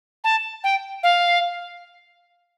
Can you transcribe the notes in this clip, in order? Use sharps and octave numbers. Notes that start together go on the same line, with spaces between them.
A5
G5
F5